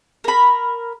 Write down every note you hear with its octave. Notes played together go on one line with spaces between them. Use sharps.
A#4 B5